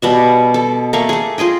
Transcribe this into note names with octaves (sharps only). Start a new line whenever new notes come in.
B2 G3 E5
A4
A3 A#3 F5 C#6
A3 G#4
F4 G#4 D#5 G5